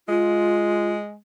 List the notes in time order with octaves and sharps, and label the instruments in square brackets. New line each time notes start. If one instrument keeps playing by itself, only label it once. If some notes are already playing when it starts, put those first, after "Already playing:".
[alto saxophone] G#3 [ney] F4